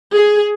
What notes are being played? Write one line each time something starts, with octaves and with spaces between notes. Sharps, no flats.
G#4